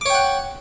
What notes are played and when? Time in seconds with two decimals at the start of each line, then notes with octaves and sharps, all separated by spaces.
0.01 D6
0.06 C#5
0.10 G5
0.14 F#5